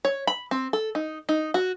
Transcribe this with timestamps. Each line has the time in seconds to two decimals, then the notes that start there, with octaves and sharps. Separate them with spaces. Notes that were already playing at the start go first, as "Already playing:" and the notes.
0.05 C#5
0.27 B5
0.51 C4
0.73 A4
0.95 D#4
1.29 D#4
1.54 F#4